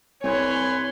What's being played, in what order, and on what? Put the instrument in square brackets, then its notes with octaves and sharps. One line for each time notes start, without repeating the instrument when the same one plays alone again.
[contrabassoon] C2 [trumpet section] B4 G#5 C6 [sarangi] C#5